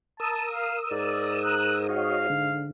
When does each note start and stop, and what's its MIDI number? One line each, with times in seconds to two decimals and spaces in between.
0.20 1.87 70
0.20 0.46 81
0.20 1.87 87
0.20 1.87 88
0.52 0.77 77
0.91 2.71 44
0.91 1.38 74
1.43 1.78 90
1.89 2.27 66
1.89 2.27 73
1.89 2.27 75
1.89 2.68 77
2.30 2.71 50